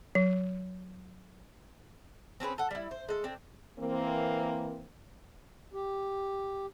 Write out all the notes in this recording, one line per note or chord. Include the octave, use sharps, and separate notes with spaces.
F#3
C4 C#4 G#4 B4
A4 F#5
G3 E4
C5
G#3 A4
C4 D4
E3 A#3 C4
G4